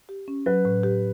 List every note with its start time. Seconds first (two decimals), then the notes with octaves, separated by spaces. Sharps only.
0.09 G4
0.28 C#4
0.46 F#3 B4
0.65 A2
0.83 G4